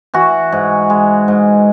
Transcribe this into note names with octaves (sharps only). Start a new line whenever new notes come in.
E3 F#4
G#2
G#3
G#2